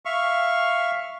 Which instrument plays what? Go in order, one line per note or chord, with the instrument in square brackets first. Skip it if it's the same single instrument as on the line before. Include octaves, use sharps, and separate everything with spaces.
[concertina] E5 F5 C#6